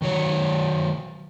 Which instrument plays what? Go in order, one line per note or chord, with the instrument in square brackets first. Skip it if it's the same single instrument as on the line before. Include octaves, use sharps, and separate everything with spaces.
[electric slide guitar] D#3 F#3 C#5